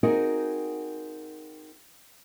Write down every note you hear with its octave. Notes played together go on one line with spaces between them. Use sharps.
C4 D#4 F#4 G#4 A#4